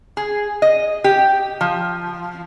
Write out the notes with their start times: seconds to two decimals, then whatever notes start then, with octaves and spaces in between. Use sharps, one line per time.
0.17 G#4
0.62 D#5
1.04 G4
1.61 F3